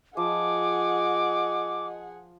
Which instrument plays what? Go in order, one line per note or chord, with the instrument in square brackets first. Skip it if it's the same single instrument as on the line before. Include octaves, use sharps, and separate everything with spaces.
[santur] F3 [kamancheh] G#4 F#5 [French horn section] D#5 [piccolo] D6